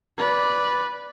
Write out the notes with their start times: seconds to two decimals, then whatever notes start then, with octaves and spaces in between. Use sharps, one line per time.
0.18 B4 D5